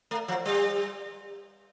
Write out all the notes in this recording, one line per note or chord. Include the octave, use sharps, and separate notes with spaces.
A3
F3
G3